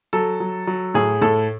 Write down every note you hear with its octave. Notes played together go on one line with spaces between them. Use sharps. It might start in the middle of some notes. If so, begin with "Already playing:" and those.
F#3 A4
F#3
F#3
A2 G#4
A2 A4